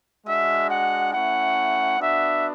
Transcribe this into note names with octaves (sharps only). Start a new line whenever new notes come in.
G#3 D4 F#4 E5
F#5
A3 C#4 E4 F#5
B3 D4 F#4 E5